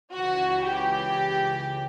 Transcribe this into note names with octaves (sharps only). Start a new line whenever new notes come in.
C#2 C#3 E3 F#4
G4